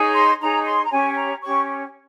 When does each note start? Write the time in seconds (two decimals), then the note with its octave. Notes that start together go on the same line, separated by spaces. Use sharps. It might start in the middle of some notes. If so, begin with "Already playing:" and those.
Already playing: D#4 G#4 C#5
0.14 C6
0.40 D#4 G#4 C#5 A#5
0.65 C6
0.85 A#5
0.91 C#4 G4 C#5 G#5
1.16 A#5
1.42 C#4 G4 C#5 C#6